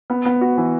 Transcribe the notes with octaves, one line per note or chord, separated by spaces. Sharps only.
B3
B3
F#4
E3